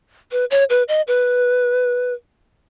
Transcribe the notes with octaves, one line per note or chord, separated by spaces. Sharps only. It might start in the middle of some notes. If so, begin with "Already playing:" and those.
B4
C#5
B4
D#5
B4